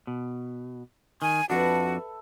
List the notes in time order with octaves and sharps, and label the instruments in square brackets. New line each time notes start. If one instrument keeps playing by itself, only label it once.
[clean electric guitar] B2
[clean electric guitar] D#3 [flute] G#5
[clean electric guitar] F2 D4 [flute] F#4 [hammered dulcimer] A4 B4 E5